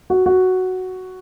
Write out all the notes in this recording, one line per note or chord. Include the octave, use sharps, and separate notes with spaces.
F#4
F#4